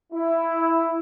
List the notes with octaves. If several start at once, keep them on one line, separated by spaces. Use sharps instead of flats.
E4